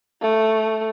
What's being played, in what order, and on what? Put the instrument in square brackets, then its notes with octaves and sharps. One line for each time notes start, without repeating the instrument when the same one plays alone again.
[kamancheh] A3